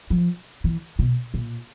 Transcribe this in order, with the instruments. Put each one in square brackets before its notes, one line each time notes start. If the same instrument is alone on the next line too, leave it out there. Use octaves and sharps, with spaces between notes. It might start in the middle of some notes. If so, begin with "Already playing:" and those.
[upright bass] F3
E3
B2
A#2